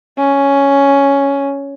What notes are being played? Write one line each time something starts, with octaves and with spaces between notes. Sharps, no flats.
C#4